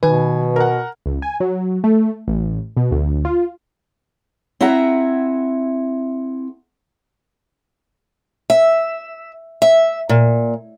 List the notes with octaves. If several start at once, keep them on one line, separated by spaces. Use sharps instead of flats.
B2 D#3 B4 G#5
A#4 F#5
C#2
G#5
F#3
A3
A1
B2
D2
F4
C4 E4 G#4 E5 F#5 A#5
E5
E5
A#2